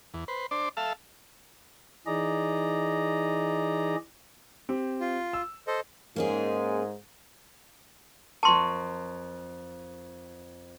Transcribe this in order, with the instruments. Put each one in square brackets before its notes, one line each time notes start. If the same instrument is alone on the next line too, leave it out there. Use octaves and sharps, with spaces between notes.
[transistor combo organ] E2
B4 C5
D4 C5 D5
A4 E5 F5 A5
[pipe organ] E3 D#4 G#4 D5 D#5 A#5
[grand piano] C4 G4
[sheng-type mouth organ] F4
[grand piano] E6
[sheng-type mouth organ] A4 C5 D#5
[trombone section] G#2 [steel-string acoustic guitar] A#3 C#4 G#4
[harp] F2 A#4 C#6 [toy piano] A5 C6